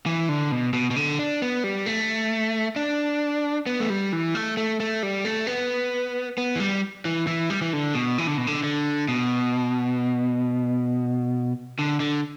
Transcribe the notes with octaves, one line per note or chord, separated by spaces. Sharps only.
E3
D3
B2
B2
B2
D3
D4
B3
G3
A3
D4
B3
A3
G3
E3
A3
A3
A3
G3
A3
B3
B3
E3
G3
E3
E3
G3
E3
D3
B2
E3
D3
B2
D3
D3
B2
D3
D3